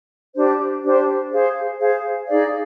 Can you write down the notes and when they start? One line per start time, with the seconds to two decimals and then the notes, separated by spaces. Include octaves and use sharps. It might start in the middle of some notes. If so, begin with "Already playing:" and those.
0.35 D4 G4 C5
0.83 D4 G4 C5
1.31 G#4 C5 F5
1.79 G#4 C5 F5
2.27 D#4 G#4 D5 F5